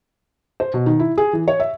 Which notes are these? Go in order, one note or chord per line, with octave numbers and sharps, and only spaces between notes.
C5
B2
D#3
E4
G#4
E3
C#5
E5